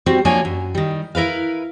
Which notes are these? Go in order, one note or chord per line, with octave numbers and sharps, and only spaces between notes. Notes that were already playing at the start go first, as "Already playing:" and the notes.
G3 C4 F#4
F3 F#3 A#3 D4 C#5 G#5
F#2
D#3 G3
E4 A#4 B4 F5